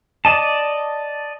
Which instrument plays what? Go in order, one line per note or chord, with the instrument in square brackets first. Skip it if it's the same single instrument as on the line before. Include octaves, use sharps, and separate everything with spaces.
[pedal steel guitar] D5 D#5 A5